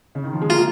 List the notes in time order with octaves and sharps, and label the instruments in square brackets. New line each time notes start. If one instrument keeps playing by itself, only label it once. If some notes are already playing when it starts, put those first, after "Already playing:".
[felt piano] C#3
D#3
F3
G#3
[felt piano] A#3 [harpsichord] F4